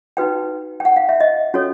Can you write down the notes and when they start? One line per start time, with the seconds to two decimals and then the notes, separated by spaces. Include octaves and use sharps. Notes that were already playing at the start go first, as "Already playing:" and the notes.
0.17 D#4 F#4 B4 G5
0.80 G5
0.85 F#5
0.97 F5
1.09 E5
1.20 D#5
1.54 C#4 F#4 A4 C#5